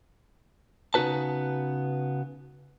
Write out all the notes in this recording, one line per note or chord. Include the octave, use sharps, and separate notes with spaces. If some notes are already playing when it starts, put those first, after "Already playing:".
C#3 B3 D#4 F#4 B4 A5